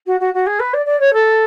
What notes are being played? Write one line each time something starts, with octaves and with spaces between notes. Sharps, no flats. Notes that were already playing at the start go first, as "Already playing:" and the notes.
F#4
F#4
F#4
G#4
B4
D5
D5
C#5
A4